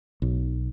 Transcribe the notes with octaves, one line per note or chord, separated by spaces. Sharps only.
B1